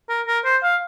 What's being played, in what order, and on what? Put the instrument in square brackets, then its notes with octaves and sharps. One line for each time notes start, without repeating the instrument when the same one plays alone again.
[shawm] A#4
A#4
C5
F5